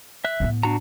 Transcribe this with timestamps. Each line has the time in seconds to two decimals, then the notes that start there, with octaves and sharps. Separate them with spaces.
0.25 E5 F#6
0.40 A2 B3
0.63 D4 F#4 A#5